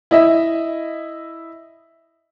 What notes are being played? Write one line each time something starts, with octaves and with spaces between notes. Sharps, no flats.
E4 D#5 E5